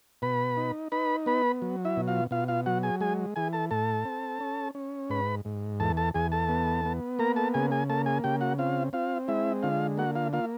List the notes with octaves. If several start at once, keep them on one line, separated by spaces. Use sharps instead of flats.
B2 B4 B5
D#4
D#4 B4 B5
B3 B4 B5
F#3
E4 E5
B2
F4 F5
B2 F4 F5
F4 F5
F#3 F#4 F#5
G#4 G#5
G#3 G#4 G#5
E3 G#4 G#5
A4 A5
A2 A4 A5
C4
C#4
C#4
G#2 B4 B5
G#2
E2 A4 A5
A4 A5
E2 G#4 G#5
A4 A5
B3
B3
A#3 A#4 A#5
A4 A5
C#3 G#4 G#5
G#4 G#5
A#3 A4 A5
G#4 G#5
C#3 G4 G5
F#4 F#5
C4 F4 F5
C4 F4 F5
G#3 E4 E5
D3 F4 F5
A#3 F#4 F#5
F4 F5
A#3 F4 F5